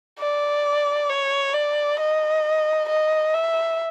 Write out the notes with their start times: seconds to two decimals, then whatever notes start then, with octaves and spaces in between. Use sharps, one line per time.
0.19 D5
1.10 C#5
1.54 D5
2.00 D#5
2.89 D#5
3.33 E5